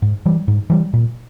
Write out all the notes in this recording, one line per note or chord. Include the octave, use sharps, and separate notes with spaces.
G#2
E3 G3
G#2
E3 G3
A#2